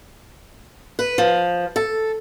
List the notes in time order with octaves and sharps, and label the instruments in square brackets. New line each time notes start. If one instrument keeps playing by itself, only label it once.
[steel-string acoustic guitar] B4
F3
A4